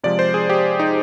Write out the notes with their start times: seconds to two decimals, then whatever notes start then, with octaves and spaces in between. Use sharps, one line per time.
0.03 C3 F3 G#3 D5
0.19 C5
0.34 G#4
0.50 G4
0.80 D#4